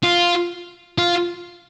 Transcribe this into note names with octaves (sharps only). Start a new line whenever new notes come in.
F4
F4